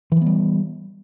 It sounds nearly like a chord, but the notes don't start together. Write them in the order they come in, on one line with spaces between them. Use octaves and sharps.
E3 F3 B3 G3